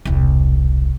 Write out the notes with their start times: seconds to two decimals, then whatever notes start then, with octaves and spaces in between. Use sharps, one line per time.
0.05 E1 C2